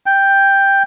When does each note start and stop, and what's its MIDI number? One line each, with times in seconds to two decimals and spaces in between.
0.06 0.83 79